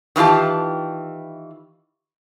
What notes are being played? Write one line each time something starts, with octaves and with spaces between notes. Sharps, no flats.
D#3 E3 F4 G4 A5